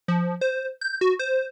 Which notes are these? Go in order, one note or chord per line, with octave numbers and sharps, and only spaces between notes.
F3
C5
G6
F#4
C5